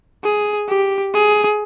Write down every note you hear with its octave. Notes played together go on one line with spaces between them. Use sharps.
G#4
G4
G#4